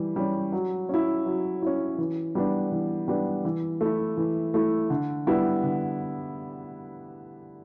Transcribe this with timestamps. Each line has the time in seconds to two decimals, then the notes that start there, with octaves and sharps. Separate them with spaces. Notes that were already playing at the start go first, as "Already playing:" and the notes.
Already playing: E3 G3
0.16 G3 C#4
0.52 F#3
0.89 C#4 E4
1.26 F#3
1.62 C#4 E4
1.98 E3
2.35 G3 B3 D4
2.72 E3
3.08 G3 B3 D4
3.45 E3
3.81 A3 E4
4.17 E3
4.54 A3 E4
4.90 D3
5.27 G3 B3 E4
5.63 D3